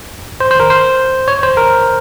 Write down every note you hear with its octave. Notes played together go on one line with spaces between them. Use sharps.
C5
C5
A#4
C5
C#5
C5
A#4